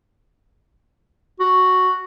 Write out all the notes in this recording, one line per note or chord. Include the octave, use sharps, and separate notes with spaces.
F#4